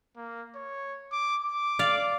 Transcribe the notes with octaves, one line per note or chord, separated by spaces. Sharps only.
A#3
C#5
D6
D6
D5 F5